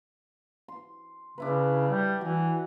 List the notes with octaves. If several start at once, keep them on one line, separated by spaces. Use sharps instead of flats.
C6
C#3 D4 E4 B4
G3
E3 F#4